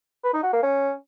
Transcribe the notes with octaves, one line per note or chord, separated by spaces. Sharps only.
B4
D#4
F#4
A#3
C#4